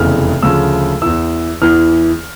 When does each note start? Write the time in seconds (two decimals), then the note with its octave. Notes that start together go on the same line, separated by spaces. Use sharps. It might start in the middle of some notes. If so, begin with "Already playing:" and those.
Already playing: F1 E2 C#3 F6
0.43 D2 C#3 F3 E6
1.02 E2 E3 E6
1.62 E2 E3 F6